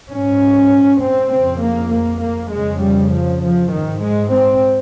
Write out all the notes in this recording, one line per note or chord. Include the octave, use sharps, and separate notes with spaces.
G#2 C#4
C4
F2 C#3 C4
A#3
A#3
A#3
F2 C#3 G#3
G3
F3
F3
G#2 D#3
G#3
C4